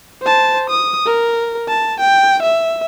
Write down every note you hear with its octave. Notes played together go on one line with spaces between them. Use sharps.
C5 A5
D#6
A#4
A5
G5
E5